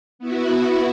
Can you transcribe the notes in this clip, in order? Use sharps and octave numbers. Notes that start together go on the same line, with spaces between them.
B3 E4 F#4